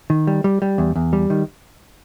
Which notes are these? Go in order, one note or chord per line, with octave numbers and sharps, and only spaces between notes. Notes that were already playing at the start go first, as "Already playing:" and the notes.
D#3
G3
G3
G3
E2
E2
G3
D#3